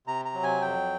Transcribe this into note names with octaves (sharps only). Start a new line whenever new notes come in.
C3 A#5
A#5
F#3
G#5
F2 G5